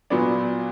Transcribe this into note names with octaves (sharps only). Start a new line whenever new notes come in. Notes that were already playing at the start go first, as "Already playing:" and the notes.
A#2 F#3 B3 D4